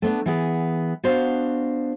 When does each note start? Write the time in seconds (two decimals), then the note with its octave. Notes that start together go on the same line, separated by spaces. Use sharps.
0.02 A3 B3 C#4 D4
0.26 E3 B3 G#4
1.04 B3 D4 F#4 C5 F5